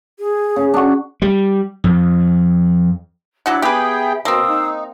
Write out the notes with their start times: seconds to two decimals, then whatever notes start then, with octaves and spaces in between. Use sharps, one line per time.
0.19 G#4
0.56 C#3
0.74 D4 F#4
1.22 G3
1.84 F2
3.46 F#3 D4 E4 F#4 F#5 D6
3.62 B3 G4 G#4 B4 E5 G5
4.25 B2 A#3 C4 F5 D#6 E6
4.49 D#4